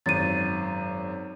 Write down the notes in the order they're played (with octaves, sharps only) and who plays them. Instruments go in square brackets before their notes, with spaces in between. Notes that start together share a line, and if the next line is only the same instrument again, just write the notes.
[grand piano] G#1 F#2 [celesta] A6 D#7